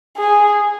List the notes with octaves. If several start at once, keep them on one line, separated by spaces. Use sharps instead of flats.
G#4